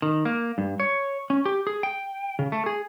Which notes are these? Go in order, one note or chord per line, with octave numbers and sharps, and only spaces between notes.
D#3
A#3
G2
C#5
C#4
G4
G#4
G5
C#3
A3
G#4